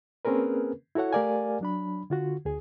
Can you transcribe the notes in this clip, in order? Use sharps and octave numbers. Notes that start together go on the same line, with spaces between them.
A#3 C4 C#4 G#4 A#4 B4
E4 F#4 A4 C#5 F#5
A3 G4 A#4 D5 F5 G#5
F#3 D4 B5
D3 F4 F#4
D2 G#4